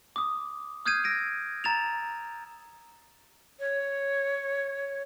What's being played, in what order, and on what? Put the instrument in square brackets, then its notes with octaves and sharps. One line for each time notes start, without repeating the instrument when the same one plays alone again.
[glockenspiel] D6 D#6
D#6 F6 G6 G#6 C7 D#7
E6 A#6 D7 D#7
A#5 A6 E7 F7
[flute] C#5